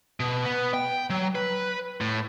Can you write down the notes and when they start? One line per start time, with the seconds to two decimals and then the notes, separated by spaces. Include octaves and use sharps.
0.20 B2
0.45 B3
0.74 G5
1.10 F#3
1.35 B4
2.01 A2